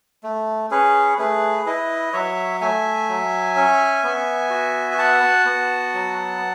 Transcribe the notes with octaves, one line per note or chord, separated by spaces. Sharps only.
A3
C#4 G#4 B4
A3 G#4 B4
E4 B4 D#5
F#3 C#5 E5
A3 E5 G#5
F#3
C#4
B3
F#4
G#5
F#4 F#5 A5
B3
F#3